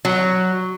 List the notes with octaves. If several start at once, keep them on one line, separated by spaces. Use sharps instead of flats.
F#3